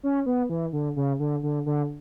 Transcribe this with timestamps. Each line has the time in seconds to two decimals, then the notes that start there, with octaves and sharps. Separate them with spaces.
0.03 C#4
0.26 B3
0.49 E3
0.73 D3
0.96 C#3
1.19 D3
1.43 D3
1.66 D3